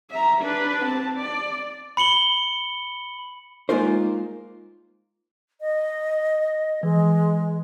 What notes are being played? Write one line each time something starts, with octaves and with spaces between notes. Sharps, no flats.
E5 A#5
D4 B4
C4 A5
D5
B5 C#7 F#7 G7
G#3 A#3 D#4 F4 A#4 C5
D#5
E3 G#3